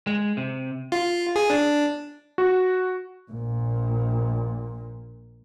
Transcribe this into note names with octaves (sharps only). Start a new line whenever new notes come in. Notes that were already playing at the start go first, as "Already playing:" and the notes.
G#3
C3
F4
G#4
D4
F#4
A#1 A#2